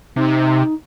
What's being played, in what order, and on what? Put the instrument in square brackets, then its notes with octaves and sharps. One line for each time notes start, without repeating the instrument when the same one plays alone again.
[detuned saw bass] C3 [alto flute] D#4